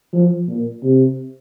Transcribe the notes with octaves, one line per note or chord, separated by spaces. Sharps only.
F3
A#2
C3